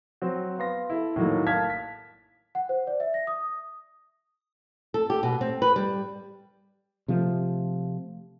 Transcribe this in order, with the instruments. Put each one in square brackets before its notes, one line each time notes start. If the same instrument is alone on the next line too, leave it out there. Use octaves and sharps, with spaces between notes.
[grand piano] F#3 C4
B3 F5 C6 A#6
E4 A4
A2 D#3 F#3 A#3
F5 A5 F6 G#6 B6
B6
[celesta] F#5
C5
D5
E5
A#6
D#6
[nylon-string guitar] A4
G4
B2
C4
B4
G3
[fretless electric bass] C3 F3 A3